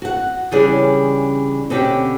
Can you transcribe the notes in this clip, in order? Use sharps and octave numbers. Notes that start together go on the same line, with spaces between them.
F#4 F#5
C#3 E3 G3 C#4 D4 G#4
B2 D3 C4 C#4 F#4 G4